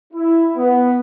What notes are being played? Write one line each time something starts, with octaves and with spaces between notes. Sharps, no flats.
E4
B3